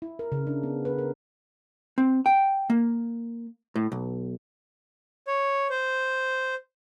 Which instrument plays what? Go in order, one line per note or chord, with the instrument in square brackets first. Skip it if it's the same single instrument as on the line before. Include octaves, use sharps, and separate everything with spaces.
[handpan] E4
A#4
C#3
D4
B3
B4
A#4
[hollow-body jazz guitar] C4
G5
A#3
A2
B1
[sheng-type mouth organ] C#5
C5